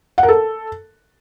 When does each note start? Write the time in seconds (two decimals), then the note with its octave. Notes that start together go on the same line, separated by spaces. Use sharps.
0.18 F#5
0.23 A#4
0.28 A4